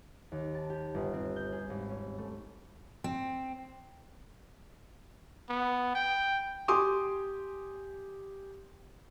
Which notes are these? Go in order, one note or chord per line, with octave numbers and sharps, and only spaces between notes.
D#2
A5
G4
G1
C4
G6
G#4
G#1
C#4
A3
C4
B3
G5
G4 G#5 C6 D6 D#6